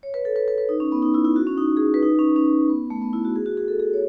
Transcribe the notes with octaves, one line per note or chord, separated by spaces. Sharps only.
C#5
B4
A4
B4
B4
B4
D#4
C#4
B3
D#4
E4
E4
F#4
C#4
D#4
G#4
B4
D#4
C#4
C#4
B3
A3
B3
E4
F#4
G#4
F#4
G#4
A4
G#4
C#5